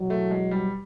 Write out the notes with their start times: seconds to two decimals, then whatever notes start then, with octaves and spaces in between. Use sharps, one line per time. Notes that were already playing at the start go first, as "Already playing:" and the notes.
Already playing: E2 B2 F#3
0.10 A3
0.31 G#3
0.51 G3